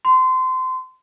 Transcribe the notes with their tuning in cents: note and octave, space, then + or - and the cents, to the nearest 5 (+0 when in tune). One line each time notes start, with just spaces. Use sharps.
C6 -25